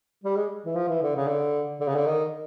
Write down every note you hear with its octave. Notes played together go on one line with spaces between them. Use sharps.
G3
G#3
E3
F3
E3
D3
C#3
D3
D3
C#3
D3
D#3